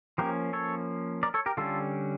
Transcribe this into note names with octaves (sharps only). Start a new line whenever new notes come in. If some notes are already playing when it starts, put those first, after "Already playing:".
F3 A#3 C#4 G4 A#4
A4 C#5
A#4 D5
A4 C#5
G4 A#4
D3 G3 C#4 F4 A4